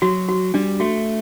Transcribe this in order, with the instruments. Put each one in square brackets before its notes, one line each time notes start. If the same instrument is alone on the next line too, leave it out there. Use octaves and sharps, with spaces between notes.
[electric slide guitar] F#3 [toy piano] F#4
[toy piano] F#4
[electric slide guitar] G3 [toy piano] D4
[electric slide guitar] A3 [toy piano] F#4